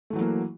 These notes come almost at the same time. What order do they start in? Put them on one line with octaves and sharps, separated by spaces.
A3 E3 F#3 F#4 A#3